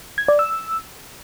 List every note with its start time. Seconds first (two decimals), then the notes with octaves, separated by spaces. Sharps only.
0.18 G#6
0.28 D5
0.39 E6